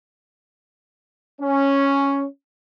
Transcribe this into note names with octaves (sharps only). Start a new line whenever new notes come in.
C#4